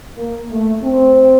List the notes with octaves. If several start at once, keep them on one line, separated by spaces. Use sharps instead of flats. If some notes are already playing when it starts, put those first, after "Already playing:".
A#3
A3
C4